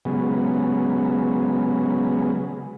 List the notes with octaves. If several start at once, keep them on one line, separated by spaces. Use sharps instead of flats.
C#3 F#3 G#3 B3